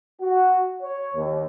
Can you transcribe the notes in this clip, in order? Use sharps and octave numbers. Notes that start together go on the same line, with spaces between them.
F#4
C#5
D#2